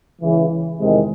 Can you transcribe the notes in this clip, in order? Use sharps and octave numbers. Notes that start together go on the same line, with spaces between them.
C#2 C#3 E3
E2 C3 D#3 G#3